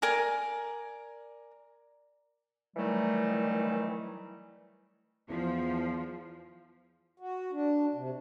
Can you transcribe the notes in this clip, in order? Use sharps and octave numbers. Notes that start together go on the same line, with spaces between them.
A#4 D5 G#5 A#5
D#3 E3 F#3 G3 A3
E2 F3
F#4
D4
C3